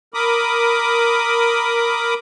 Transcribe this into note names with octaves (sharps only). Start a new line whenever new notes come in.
A#4 B5 D6 D#6